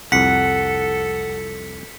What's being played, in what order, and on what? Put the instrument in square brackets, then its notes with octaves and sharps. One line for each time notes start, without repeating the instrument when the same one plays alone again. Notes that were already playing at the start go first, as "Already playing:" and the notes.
[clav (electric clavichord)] C2 F2 [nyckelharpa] A4 [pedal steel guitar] F#5 [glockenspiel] B6 C#7